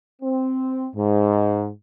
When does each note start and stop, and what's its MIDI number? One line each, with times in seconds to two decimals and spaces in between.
0.22 0.87 60
0.96 1.69 44